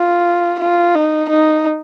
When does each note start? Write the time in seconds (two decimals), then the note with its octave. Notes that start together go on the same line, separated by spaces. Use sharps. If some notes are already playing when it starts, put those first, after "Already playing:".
Already playing: F4
0.59 F4
0.95 D#4
1.29 D#4